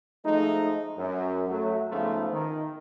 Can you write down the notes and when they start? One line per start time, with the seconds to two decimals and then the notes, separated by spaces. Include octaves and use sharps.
0.24 F3 G#3 A3 D#4
0.97 F#2
1.49 F#3 A3
1.91 G#2 C#3 F3 A3 B3 F4
2.32 D#3